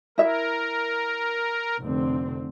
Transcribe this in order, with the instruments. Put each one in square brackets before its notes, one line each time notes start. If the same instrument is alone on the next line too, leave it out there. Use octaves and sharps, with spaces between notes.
[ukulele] E4 E5 [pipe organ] A#4
[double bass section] F1 D3 C4